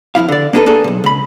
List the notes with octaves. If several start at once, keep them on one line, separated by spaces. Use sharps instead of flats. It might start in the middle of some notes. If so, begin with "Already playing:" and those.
F2 G#2 E4 F5
D3 D5
A#3 D4 D#4 F4 A4 B4
A#3 D4 G#4 A4
B1 A#2
C#2 B5